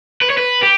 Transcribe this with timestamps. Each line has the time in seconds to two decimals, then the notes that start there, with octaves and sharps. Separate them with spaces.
0.22 B4
0.30 C#5
0.38 B4
0.62 G4